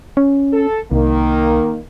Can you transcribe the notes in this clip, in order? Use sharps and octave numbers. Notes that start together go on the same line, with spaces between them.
C#4
A4
C2 D#3 A#3